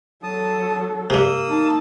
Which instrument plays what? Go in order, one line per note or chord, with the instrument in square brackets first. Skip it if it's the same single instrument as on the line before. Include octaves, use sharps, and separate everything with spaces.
[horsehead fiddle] F#3 A4 [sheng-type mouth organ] A5 D#6
[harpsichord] G2 C3 [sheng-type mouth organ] A#3 D#6 E6
[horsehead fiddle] D#4 A5